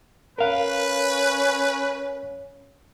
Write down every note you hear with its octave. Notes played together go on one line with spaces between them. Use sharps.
C#4 A#4 B4 F5